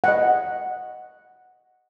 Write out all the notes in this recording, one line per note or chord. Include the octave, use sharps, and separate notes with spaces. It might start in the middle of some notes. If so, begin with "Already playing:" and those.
D#5 F#5